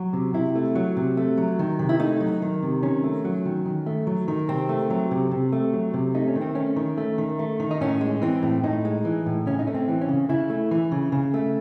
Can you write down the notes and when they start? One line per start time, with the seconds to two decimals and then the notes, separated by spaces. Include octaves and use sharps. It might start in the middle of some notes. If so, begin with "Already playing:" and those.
Already playing: F#3 F#4
0.13 C3
0.34 C3 E4
0.55 A3
0.75 F#3
0.97 C3
1.17 A3
1.38 F#3
1.59 D#3
1.79 C3
1.89 E4
2.00 A3 D#4
2.20 F#3
2.42 D#3
2.63 C3
2.83 D#3 C#4
3.04 A3
3.25 F#3
3.45 D#3
3.66 D#3
3.86 A3
4.07 F#3
4.28 D#3
4.48 C3 C4
4.69 A3
4.90 F#3
5.11 C3
5.31 C3
5.53 A3
5.73 F#3
5.94 C3
6.14 A3 D#4
6.28 C#4
6.36 D#3
6.41 C4
6.55 A3 C#4
6.76 D#3
6.98 A3
7.18 D#3
7.39 A3
7.60 D#3
7.71 D#4
7.81 A2 C#4
8.01 G#3
8.22 E3 C4
8.43 A2
8.63 A2 D#4
8.85 G#3
9.05 E3
9.26 A2
9.46 C#3 C#4
9.59 D#4
9.67 A3 C#4
9.74 C4
9.88 E3
10.01 C#4
10.09 C#3
10.29 C#3 E4
10.50 A3
10.71 E3
10.92 C#3
11.12 C#3
11.34 A3